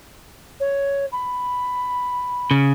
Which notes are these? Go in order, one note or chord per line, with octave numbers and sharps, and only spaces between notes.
C#5
B5
C#3